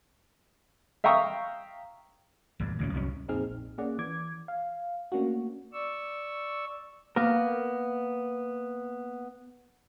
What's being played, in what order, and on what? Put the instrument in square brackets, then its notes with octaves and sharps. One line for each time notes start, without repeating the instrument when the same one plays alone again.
[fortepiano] E5 F5 G5 A#5 C#6 D#6
[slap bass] A1 E2 G2
D2 A#2 C#4
C2 F#2 G3 C#4
[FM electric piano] F2 A#2 C4 D#4 G#4 F6
A#1
A#3 C#4 G#4 D5 F#5
E3 D6 G#6
F5
A3 A#3 C#4 D4 F#4
[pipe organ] D5 C#6 E6
[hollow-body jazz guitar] A#3 B3 A#4